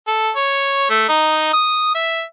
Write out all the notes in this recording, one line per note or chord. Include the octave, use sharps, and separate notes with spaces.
A4
C#5
A3
D#4
D#6
E5